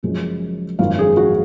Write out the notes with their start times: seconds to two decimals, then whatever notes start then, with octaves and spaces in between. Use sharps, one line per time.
0.03 F#1 F#2 F3 G#3
0.79 G#1 F#2 F3 F5
0.99 G#4
1.17 F#4